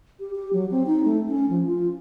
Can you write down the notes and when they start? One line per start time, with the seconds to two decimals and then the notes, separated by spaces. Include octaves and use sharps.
0.20 G4
0.35 G4
0.53 F#3
0.71 C4
0.86 D#4
1.05 A3
1.29 C#4
1.49 F3
1.66 F4